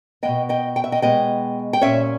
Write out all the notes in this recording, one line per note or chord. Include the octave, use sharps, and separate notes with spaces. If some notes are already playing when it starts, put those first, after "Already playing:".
G#3 B3 D#5 G5
B2
D#5 G5
G5
E5
D#5 G5
B2 G#3 B3 D#5 G5
G5
A#2 G3 C#4 C#5 E5